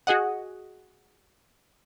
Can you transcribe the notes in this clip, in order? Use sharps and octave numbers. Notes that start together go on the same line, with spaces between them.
F#4 G#4 D#5 F#5